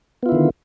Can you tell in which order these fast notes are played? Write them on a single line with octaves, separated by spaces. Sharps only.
B3 F4 E4 D3 D#3